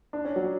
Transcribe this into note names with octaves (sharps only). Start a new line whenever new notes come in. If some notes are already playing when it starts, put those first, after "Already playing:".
D4
C#4
F#3